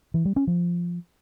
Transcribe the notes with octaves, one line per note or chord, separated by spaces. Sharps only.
E3
G3
C#4
F3